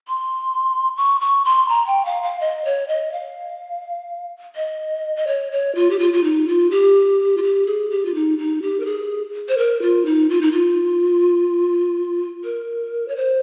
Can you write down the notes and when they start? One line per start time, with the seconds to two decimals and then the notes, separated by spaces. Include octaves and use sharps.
0.08 C6
0.97 C#6
1.21 C#6
1.45 C6
1.69 A#5
1.87 G5
2.06 F5
2.23 F5
2.41 D#5
2.65 C#5
2.88 D#5
3.13 F5
4.56 D#5
5.16 D#5
5.27 C#5
5.52 C#5
5.75 F4
5.90 G4
5.99 F4
6.13 F4
6.24 D#4
6.48 F4
6.71 G4
7.37 F4
7.43 G4
7.66 G#4
7.91 G4
8.05 F4
8.15 D#4
8.38 D#4
8.62 G4
8.80 A#4
8.86 G#4
9.49 C5
9.58 A#4
9.82 F4
10.06 D#4
10.30 F4
10.41 D#4
10.52 F4
12.44 A#4
13.08 C#5
13.17 C5